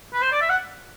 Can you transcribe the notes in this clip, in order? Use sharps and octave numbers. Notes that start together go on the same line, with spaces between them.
B4
C5
D5
E5
F#5